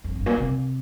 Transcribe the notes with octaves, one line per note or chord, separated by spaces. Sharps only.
F2
G2
A#2
C3